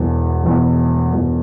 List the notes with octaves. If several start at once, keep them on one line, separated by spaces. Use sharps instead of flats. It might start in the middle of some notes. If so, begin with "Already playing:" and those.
Already playing: E1 E2 B2
E1 E2 B2
E1 E2 B2